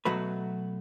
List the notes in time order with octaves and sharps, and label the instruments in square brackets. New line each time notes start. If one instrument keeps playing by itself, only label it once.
[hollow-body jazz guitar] B2 F#3 A3 F#4 B4